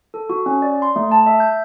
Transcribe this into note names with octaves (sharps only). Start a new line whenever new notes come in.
A4
F#4
C#4
D5
C6
A3
A5
E5
G6